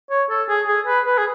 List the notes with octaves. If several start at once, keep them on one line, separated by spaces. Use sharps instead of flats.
C#5
A4
G#4
G#4
B4
B4
G#4